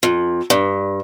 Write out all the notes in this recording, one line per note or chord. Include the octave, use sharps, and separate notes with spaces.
F2
G2